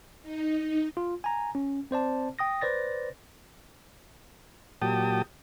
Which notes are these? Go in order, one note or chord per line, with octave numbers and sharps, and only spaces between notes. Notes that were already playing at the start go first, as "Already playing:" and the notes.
D#4
F4
G#5 A#5
C#4
C4 C5 D5 A5
G5 D#6 A#6
B4 C5 D5 A6 A#6
A#2 F#3 G4 G5 A5 D#6